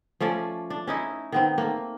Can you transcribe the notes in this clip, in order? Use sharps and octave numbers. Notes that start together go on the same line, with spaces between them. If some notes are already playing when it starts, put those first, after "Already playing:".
F3 A3 C#4 D5
D4
C#4 D#4 E4
D#3 B3 C4
A3 A#3